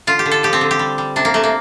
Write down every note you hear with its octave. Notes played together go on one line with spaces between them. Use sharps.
D3 F4
G4
D3
A4
F3 G4
C4
D3
G4
G3
G3
C3 D4
A#3
C3 A3
A#3